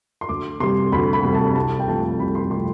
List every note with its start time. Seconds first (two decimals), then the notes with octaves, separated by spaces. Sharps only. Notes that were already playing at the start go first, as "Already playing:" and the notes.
0.21 C6
0.29 D2 D6
0.60 C3 G3 C6
0.92 D2 B5
1.13 B5
1.24 C3 G3
1.35 A5
1.56 C2 A5
1.80 G5
1.88 C3 F3 A3 A5
2.20 C2 B5
2.35 C6
2.51 C3 F3 A3 C6